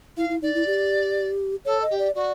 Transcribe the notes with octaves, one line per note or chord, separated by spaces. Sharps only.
E4 F5
E4
D#4 D5
E4
G4
A4 C#5
D#5
G4
D5
F#4 D5